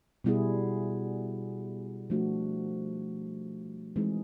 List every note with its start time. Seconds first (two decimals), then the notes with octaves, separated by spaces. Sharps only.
0.24 B2 G3 B3 E4 G#4
2.10 F3 A3 D4 F#4
3.96 E3 G#3 C4 D#4 G#4